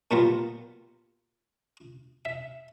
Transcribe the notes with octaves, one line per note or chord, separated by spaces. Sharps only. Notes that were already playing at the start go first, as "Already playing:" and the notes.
A#2 F#3 B3 F4 G4 A#4
E5